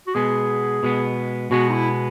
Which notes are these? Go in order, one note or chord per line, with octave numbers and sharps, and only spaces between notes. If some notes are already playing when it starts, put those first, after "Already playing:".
F#4
B2 G#3 B3 G#4
B2 G#3 B3
B2 G#3 B3 F#4
D#4
E4